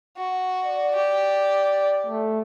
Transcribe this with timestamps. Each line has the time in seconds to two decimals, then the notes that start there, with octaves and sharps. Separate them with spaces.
0.17 F#4
0.65 D5
0.96 G4
2.06 A3